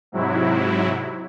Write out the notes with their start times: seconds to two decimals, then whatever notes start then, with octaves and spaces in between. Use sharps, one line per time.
0.12 G#2 C3 F#3 E4